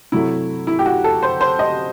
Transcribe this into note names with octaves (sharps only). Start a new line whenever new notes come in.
C3 F#3 A3 E4
E4
G4
F#4
A4
C5
C5
D#5